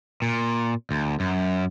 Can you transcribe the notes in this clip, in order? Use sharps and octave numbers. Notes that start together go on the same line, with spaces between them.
A#2
D2
F#2